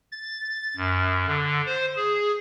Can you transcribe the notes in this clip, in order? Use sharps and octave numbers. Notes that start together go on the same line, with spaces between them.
A6
F#2
D3
C5
G#4